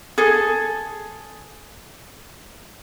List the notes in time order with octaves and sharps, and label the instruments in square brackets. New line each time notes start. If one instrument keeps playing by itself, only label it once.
[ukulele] G#4 A4